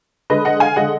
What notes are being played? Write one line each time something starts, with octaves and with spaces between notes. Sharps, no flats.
D3 G#3 B4 D#5
D#5 F#5
F5 G#5
D3 G#3 D#5 F#5